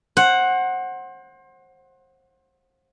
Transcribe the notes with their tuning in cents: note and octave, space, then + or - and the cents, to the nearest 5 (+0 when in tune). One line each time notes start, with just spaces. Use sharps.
C5 +30 F#5 +0